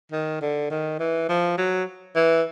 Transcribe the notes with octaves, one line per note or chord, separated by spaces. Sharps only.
D#3
D3
D#3
E3
F3
F#3
E3